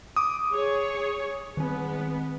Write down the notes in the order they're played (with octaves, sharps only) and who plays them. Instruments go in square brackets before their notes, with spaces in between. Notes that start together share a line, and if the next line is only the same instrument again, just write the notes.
[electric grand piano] D6 D#6
[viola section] G#4 C#5
[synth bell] D#3 C4 [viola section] G#3 B3